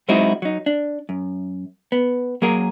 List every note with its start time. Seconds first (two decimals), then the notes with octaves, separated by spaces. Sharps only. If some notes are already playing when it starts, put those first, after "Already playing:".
0.08 F#3 G#3 C4 D#4 E4 F#4
0.42 F#3 D#4
0.66 D4
1.09 F#2
1.92 B3
2.42 F#3 A#3 G#4 A#4